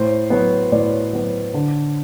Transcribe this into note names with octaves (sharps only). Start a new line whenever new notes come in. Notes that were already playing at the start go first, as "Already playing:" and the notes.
Already playing: A2 C5
F#3 B3
A2 D5
F#3 B3
D3